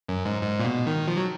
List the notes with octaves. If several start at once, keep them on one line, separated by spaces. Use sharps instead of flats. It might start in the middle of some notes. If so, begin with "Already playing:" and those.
F#2
G#2
G#2
A#2
B2
D#3
F3
F#3